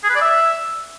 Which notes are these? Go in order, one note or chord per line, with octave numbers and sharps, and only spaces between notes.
G#4
B4
D5
E5